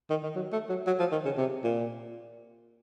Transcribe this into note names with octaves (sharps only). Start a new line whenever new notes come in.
D#3
D#3
F#3
A3
F#3
F#3
F3
D#3
C#3
C3
A#2